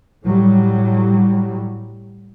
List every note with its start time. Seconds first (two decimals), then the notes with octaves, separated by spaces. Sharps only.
0.25 A2 F#3 G3